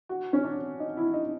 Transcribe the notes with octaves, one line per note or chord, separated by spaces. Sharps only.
F#4
C#4
D4
D#4
E4
D#4